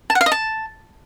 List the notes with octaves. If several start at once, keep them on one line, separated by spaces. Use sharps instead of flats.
A5
F#5
F5
D#5
A5